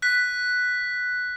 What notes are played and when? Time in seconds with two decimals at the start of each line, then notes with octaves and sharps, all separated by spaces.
0.02 F#6 B6